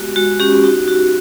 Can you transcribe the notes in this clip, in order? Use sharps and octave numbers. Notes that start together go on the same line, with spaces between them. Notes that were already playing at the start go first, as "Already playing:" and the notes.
Already playing: G#3 B3 F#4 G4
G#3 F#4
C#4 G4
G4
D#4 F#4
D#4 F#4